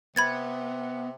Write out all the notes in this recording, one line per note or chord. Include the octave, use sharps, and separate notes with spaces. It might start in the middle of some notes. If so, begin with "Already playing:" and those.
C3 B3 B5 G#6 A6